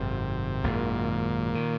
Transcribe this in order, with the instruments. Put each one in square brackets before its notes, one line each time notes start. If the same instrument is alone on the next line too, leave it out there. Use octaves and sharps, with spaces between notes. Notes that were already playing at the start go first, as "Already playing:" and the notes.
Already playing: [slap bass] G#1 F#2 D#3 [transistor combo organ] C3
[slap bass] G#1 F#2 D#3 [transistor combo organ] A#2
[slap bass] D#3